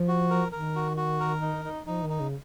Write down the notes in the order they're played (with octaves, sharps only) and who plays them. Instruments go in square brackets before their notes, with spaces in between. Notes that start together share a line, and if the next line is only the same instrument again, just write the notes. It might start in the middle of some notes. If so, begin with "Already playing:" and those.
Already playing: [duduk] F3
[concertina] F#4
A#4
[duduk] D#3 [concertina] A#4
[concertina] F#4
F#4
A#4
D#4
D#4
[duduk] F3 [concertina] D#4
[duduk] D#3
[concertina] D#4
[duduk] C#3